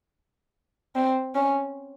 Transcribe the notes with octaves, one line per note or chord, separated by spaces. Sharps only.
C4
C#4